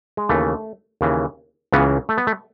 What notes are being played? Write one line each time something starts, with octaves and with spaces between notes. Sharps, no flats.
G#3
D#2 C#3 E3 A3
D#2 C#3 E3
C#2 C#3 E3 B3
A3
B3
A3